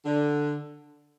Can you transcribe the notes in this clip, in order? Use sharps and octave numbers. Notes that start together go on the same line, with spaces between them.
D3